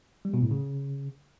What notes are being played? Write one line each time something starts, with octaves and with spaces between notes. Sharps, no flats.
G3
B2
A2
C#3